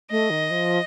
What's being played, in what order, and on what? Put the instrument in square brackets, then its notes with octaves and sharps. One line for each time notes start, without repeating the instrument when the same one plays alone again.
[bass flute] A3 [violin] D#5
[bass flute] D#3
F3